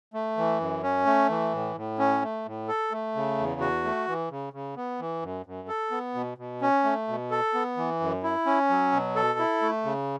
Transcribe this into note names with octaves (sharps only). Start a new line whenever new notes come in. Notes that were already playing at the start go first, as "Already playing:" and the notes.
A3
E3
F#2
C#4
A3
E3
A2
A2
C#4
A3
A2
A4
A3
C#3
E2
F#4
A3
E3
C#3
C#3
B3
E3
F#2
F#2
A4
B3
B2
B2
C#4
A3
B2
A4
B3
E3
F#2
E4
C#4
F#3
B2
A4
E4
A3
C#3